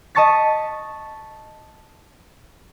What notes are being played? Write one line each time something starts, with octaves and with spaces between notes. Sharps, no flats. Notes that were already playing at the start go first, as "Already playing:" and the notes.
D#5 A5 C#6 A6 B6